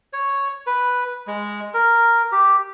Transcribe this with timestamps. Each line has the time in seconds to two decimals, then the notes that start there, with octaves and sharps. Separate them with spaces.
0.13 C#5
0.67 B4
1.27 G#3
1.74 A#4
2.32 G4